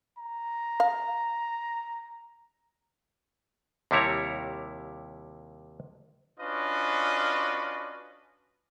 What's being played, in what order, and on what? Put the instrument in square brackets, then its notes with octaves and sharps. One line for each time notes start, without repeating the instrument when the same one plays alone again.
[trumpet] A#5
[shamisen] F5
[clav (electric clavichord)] D#2 C3 G3 E4 C#5 A#5
[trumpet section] C#4 D4 F4 F#4 B4 D#5